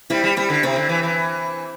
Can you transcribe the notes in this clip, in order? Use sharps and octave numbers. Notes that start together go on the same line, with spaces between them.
G3 C4 E4
G3
G3 C4 E4
D3
C3 C4 E4
D3
E3
E3